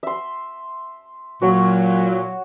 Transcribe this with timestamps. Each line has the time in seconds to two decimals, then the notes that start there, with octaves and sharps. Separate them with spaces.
0.03 E5 C6
1.42 A#2 F#3 F#4 C#5